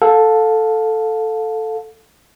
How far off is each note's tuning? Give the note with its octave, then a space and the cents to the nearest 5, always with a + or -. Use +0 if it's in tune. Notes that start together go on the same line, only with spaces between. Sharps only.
A4 +0 F5 +30